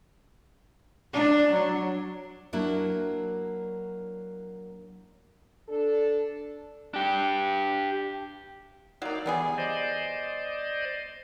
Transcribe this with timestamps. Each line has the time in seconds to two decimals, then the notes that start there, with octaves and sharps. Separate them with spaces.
1.13 D4
1.53 F#3
2.53 F#3 A#3 D4 E4 F#4
5.69 D4 A4
6.94 D4 G4
9.02 F#3 A#3 D#4 D5 F5
9.26 E3 G3 B3 G#4
9.58 C5 D5 D#5